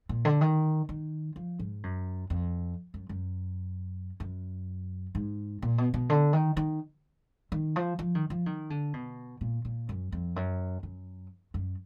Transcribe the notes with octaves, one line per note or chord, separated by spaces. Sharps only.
A#2
D3
D#3
D#3
F3
G#2
F#2
F2
F#2
F#2
F#2
G#2
A#2
B2
B2
D3
D#3
D#3
D#3
F3
F3
D#3
F3
D#3
D3
B2
A#2
A#2
F#2
F2
F#2
F#2
F#2